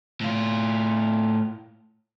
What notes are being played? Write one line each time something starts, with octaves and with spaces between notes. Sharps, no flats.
A2 F4